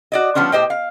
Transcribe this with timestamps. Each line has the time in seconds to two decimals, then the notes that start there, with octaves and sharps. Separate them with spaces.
0.12 F#4 D5 D#5
0.35 F3 G3 B3 C#4 D4
0.52 A2 G4 C5 D#5 G5
0.70 F5